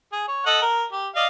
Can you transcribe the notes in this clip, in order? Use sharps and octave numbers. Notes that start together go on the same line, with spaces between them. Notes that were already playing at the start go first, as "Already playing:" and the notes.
G#4
C#5
A4 D#5 F#5
A#4
G4
D5 D#5 F5